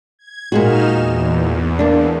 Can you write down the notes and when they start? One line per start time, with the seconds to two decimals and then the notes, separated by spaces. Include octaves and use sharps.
0.19 G#6
0.52 A#2 G#3 D#4 F#4 F6 E7
0.89 E2
1.79 A#3 D4